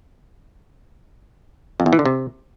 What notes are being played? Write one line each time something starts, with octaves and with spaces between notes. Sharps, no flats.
F2
E2
E3
D3
C3